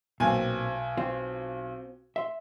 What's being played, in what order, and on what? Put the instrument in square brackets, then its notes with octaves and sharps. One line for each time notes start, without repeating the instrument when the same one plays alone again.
[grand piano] B1 G#5 [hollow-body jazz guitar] A#2 A#3 C4
[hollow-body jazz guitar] C4 F4
E5 C6